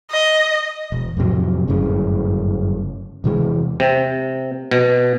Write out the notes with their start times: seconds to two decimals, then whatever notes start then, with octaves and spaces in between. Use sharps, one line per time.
0.11 D#5
0.92 E1
1.17 F2 A2 C3 F#3
1.68 G1 F#2 A2 C#3
3.24 E2 C3 E3 G#3
3.80 C3
4.71 B2